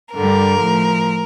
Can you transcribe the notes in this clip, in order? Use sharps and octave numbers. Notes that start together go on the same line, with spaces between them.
G2 D3 G3 A#4
A2 F3